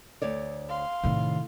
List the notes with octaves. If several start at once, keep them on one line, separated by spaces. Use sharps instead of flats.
D2 C#5 D5
F5 C6
A2 C3 D#3